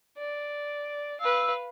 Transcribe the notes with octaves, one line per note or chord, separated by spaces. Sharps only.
D5
B4 F5 E6